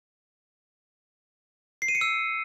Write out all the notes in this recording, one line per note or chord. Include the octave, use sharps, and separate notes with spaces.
C7
D#7
C#7
E6